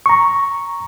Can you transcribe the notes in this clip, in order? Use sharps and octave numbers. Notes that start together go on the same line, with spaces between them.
A#5 C#6